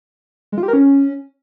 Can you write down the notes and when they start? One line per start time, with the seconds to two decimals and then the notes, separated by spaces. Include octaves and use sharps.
0.52 G#3
0.58 F4
0.63 G4
0.68 A#4
0.73 C#4